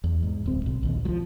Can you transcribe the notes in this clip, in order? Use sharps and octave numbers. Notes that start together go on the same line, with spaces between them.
E2
G#2
D1 C4
B1
A#1 D#2
F3 F#3